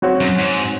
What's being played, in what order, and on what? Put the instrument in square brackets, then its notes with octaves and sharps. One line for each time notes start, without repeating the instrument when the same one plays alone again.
[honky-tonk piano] F#3 C4 F#4 C#5
[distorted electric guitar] F#2
G#2